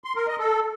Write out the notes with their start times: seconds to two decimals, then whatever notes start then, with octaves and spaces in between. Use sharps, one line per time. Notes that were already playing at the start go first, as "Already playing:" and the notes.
0.04 C6
0.16 A#4
0.27 D#5
0.39 A4